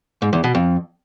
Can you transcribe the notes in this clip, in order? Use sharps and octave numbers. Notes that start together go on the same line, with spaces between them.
G#2
E2
B2
F2